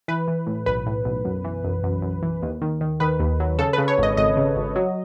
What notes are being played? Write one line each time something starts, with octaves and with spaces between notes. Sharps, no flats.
E3 B4
E3
A2
B1 B4
A2
B1
F#2
E3
F#2
F#2
F#2
E3
D#2
D#3
D#3
D#3 B4
D#2
F#3
C#3 A4
C#3 B4
C#5
G#1 D#5
G#1 D#5
C#3
G#1
F#3